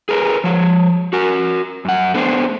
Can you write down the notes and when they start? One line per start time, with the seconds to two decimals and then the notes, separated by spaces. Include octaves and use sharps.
0.09 G#4 A#4 B4
0.44 F3 C#5
1.13 F#4 A#4
1.85 F#2 F#5
2.14 A3 B3 D4 C5